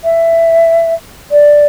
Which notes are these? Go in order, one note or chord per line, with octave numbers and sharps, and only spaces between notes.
E5
D5